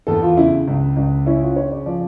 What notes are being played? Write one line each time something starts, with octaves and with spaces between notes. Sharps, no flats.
E2 A4
F4
C#3 E4
C#2
C#2
C#4 E4
F4
C#3 C#5
D5
F3 D5